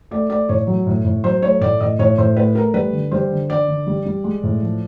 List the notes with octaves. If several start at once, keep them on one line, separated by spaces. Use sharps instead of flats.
A3 D5
A3 D5
A2 C#5
F#3
A2
A2
F#3 C5
A3 C#5
A2 D5
A2 D#5
A2 C#5
A2 C5
A3 B4
A3 A#4
G3 B4
D3
G3 C5
D3
D3 D5
D3
G3
G3
G#3
A2
F3